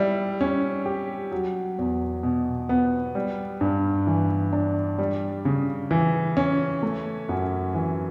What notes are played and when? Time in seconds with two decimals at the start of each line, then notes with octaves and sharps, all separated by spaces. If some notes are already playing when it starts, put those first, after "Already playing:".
Already playing: G3 E4
0.41 C#4
0.86 G4
1.32 F#3
1.78 E2
2.23 B2
2.69 B3
3.15 G3
3.61 G2
4.07 E3
4.53 D4
4.98 G3
5.45 C#3
5.91 E3
6.37 C#4
6.83 A3
7.29 F#2
7.75 E3